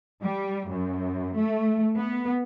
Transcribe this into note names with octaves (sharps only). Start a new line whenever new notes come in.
G3
F#2
A3
B3